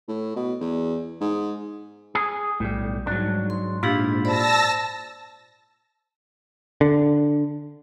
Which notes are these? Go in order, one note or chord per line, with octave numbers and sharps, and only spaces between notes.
A2
B2
E2
G#2
G#4
B1 A2 G3
G#2 F#3 G3 D4
C6
A#2 D4 E4 F4 G4 F5
C5 D5 A5 B5 E6 A#6
D3